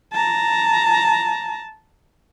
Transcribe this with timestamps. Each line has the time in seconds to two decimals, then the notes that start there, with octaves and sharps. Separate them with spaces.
0.12 A5 A#5